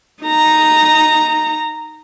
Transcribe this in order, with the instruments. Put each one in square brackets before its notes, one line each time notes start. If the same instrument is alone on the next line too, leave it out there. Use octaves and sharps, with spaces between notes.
[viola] D#4 A#5